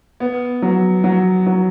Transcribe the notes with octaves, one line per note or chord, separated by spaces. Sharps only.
B3
F#3
F#3
F#3